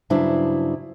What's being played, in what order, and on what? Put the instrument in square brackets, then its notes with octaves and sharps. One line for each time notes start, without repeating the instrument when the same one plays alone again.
[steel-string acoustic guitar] G2 C#3 F#3 D4 E4 C5